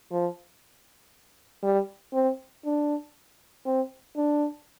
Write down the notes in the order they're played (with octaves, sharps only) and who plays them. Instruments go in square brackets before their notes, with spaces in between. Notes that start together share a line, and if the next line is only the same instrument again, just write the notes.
[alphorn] F3
G3
C4
D4
C4
D4